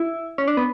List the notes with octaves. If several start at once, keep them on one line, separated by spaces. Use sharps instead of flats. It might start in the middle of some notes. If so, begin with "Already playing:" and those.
Already playing: E4
C#4
D4
B3